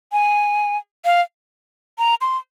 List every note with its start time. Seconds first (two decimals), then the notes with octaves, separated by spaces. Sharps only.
0.12 G#5
1.05 F5
1.98 A#5
2.21 C6